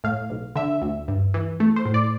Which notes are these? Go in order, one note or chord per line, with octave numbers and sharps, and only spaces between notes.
A2 F5
B1
D3 E5
D2
G2
E3
A3
C5
A2
D5